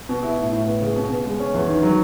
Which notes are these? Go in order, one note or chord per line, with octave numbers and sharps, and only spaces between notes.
B2
E4
A2
A2
B3
C#3
B2
B2
G#3
C#4
E2
D#3
F#3